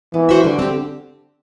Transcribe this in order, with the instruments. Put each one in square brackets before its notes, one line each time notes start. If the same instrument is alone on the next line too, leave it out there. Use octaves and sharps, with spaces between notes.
[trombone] E3 [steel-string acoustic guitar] B3
[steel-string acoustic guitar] F#4 C5 E5
[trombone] D3 [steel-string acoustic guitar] G3
[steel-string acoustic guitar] C4 G4